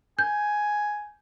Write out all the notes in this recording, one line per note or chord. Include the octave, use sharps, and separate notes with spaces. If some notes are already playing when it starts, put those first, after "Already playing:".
G#5 G6